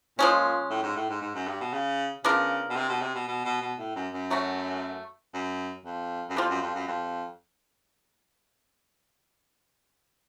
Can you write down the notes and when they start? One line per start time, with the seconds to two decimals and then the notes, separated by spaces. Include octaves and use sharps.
0.18 A#2 F3 G#3 C#4
0.70 A2
0.83 G#2
0.96 A2
1.09 G#2
1.22 G#2
1.35 F#2
1.47 G2
1.61 B2
1.73 C#3
2.24 C#3 B3 D4 F4 A#4
2.70 B2
2.76 C3
2.89 B2
3.01 C3
3.15 B2
3.28 B2
3.45 B2
3.62 B2
3.79 A2
3.96 F#2
4.13 F#2
4.30 F#3 A3 C#4 F#4
5.34 F#2
5.85 F2
6.30 F#2
6.37 F2 G3 C4 F4
6.49 F#2
6.62 F2
6.75 F#2
6.88 F2